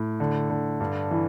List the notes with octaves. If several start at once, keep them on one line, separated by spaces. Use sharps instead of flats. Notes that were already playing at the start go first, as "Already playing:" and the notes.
Already playing: A2
D3
D3
G2
E3